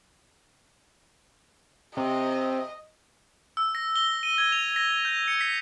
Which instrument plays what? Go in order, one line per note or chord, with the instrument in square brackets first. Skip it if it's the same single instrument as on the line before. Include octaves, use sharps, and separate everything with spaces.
[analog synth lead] C3 [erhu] D#5
[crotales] E6
A#6
G7
D#7
G#6
F7
A#6
G6
C#7
B6